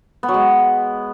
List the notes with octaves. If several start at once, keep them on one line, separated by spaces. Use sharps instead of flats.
B3
F#3
G#3